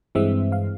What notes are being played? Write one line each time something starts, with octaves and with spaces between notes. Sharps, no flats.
G2 E3 G#3 C4 E5
F5